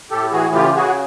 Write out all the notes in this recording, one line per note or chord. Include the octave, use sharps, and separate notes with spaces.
A2 G4 A4
E3 F#4 G#4
C#3 F4 G4
C#3 F#4 G#4